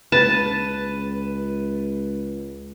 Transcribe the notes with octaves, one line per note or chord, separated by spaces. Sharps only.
C#2 B4 A5